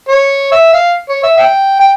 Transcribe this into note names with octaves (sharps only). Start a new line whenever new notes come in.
C#5
E5
F5
C#5
E5
E5 G5
G5